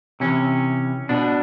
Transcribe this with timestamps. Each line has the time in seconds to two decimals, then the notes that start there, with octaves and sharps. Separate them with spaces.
0.20 C3 E3 C#4
1.09 B2 D4